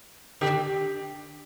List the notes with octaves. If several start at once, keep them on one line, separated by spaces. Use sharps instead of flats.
D3 G4